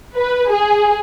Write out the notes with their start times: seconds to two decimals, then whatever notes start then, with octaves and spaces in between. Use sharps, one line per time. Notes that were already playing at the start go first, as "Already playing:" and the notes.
0.17 B4
0.52 G#4